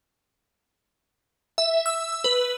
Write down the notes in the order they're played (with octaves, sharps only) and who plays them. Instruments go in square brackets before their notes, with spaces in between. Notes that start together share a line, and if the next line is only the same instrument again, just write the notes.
[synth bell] E5
E6
B4